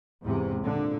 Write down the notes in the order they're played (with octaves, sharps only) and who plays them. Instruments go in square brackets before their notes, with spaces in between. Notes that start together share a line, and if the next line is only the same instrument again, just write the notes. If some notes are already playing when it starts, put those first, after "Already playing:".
[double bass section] E2 G#2 C3
A#2 D3